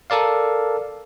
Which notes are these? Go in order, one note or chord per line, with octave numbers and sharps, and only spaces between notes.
A4 A#4 D5 F5